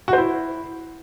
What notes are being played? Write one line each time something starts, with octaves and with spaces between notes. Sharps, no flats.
F#4
C5
E4